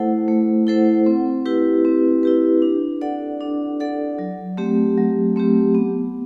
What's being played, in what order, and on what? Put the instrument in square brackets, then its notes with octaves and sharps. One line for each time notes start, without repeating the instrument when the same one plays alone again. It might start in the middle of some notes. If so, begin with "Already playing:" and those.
Already playing: [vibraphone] A3 E4 A4 C5 F#5
A3
E4 A4 C5 F#5
C4
E4 G4 B4
C4
E4 G4 B4
D4
A4 D5 F#5
D4
A4 D5 F#5
F#3
A3 C4 G4
F#3
A3 C4 G4
B3